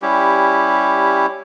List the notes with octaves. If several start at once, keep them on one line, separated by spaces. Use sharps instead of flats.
G3 C#4 E4 G4